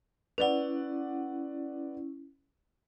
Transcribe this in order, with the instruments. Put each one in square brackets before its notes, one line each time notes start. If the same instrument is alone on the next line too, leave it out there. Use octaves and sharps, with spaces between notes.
[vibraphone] C#4 E4 [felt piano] B4 D5 F#5